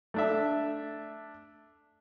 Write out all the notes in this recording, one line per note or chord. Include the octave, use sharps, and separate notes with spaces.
A3 D4 E5